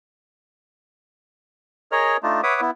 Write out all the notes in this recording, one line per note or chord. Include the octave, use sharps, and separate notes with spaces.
G#4 A#4 C#5 D#5 F6
A3 D4 D#4 F4
B4 C#5 E5 F#5 D6 D#6
B3 E4